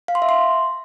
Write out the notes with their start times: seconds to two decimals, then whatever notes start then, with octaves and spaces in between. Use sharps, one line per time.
0.08 F5
0.15 C6
0.22 E5
0.29 C6